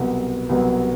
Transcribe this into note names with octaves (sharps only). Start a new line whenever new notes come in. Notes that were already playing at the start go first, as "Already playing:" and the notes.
Already playing: C2 B2 F#3
C2 B2 F#3